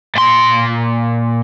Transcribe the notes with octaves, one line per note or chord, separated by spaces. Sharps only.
A#2 C6